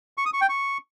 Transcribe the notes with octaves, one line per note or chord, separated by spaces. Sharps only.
C#6
D#6
C#6
G5
C#6